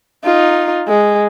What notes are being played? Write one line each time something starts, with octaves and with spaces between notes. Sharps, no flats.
D#4 F4
G#3